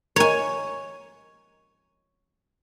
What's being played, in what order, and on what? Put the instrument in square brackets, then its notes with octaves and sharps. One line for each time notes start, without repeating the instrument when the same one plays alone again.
[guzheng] C#5 G#5